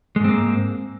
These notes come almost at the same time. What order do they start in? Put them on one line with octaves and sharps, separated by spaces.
G#3 G#2 C4 A#3